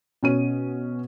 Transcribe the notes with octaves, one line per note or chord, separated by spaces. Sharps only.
B2 C#4 D#7